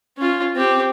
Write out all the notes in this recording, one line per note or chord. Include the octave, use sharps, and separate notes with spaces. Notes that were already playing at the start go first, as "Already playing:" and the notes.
C#4 F4
C4 G4